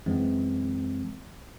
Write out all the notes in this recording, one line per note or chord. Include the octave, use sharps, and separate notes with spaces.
F#2 E3 G#3 C4